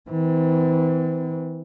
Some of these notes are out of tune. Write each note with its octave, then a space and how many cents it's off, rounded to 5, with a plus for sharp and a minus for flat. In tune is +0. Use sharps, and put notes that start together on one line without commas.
E3 -30 C4 -45